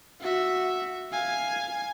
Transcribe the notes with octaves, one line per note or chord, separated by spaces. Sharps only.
F#4 E5
F5 G#5